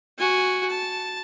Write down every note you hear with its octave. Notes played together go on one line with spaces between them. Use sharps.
F#4 G#5
A5